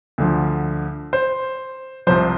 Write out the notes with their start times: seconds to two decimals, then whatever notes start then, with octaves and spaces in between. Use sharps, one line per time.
0.18 D2 D3 F3
1.13 C5
2.07 C2 C3 F3 C5